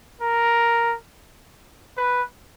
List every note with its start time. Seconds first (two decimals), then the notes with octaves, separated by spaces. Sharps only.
0.21 A#4
1.97 B4